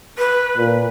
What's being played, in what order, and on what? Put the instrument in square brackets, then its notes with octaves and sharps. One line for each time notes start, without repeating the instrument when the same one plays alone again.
[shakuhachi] B4
[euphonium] A#2